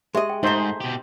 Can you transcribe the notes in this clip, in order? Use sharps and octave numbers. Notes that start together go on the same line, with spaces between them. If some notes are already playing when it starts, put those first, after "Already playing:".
G#3 G4 G#4 D#5 E5
G5 G#5
G#2 A3 D#4 G#4 C5
B2 G4